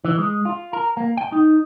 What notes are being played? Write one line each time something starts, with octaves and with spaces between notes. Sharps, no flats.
E3
G#3
F4
A#4
A#3
G5
D#4